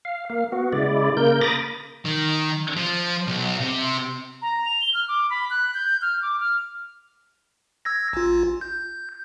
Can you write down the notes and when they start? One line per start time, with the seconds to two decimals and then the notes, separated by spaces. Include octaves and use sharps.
0.05 F5
0.30 A#3 F5
0.52 B3 F#4
0.72 C#3 G#3 E4 D5
1.17 C#3 A#3 A#4 G6
1.41 A#5 B5 D6 D#6 A6 A#6
2.05 D#3
2.77 F3
3.27 B1
3.60 C3
4.42 A#5
4.65 F7
4.81 G7
4.94 F6
5.08 D6
5.30 B5
5.50 F#6
5.74 G6
6.02 F6
6.22 D6
6.40 F6
7.85 E6 G#6 A#6
8.13 A1 F4
8.61 G6